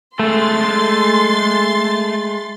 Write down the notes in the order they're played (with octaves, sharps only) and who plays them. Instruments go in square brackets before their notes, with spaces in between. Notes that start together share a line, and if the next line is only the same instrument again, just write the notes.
[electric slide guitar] G#3 A4 [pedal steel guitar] A3 [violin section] C6 A6